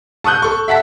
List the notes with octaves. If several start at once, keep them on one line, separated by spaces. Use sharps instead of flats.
A5 C#6 D#6 F#6 G6
A4 C#6
E5 F#5 A5 B6